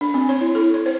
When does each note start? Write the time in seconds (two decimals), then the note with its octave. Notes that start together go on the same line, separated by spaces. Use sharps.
0.01 D4
0.14 C4
0.29 C#5
0.41 E4
0.55 A4
0.74 C#5
0.86 C5